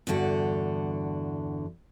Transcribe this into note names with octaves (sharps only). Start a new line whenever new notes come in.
E2 G2 D3 F#4